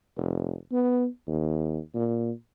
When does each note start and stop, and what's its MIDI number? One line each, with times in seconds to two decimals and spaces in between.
0.17 0.54 29
0.72 1.07 59
1.28 1.79 39
1.94 2.31 46